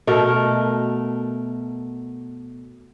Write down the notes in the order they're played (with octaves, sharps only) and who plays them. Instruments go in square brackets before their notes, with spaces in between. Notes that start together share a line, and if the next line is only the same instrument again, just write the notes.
[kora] B2 A3 A#4